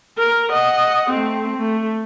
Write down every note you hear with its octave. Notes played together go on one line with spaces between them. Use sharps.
A#4
D#5 F#5
A3 C4
A3